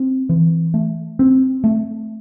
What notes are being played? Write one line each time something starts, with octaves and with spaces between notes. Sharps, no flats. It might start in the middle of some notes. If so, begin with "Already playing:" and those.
Already playing: C4
E3
A3
C4
A3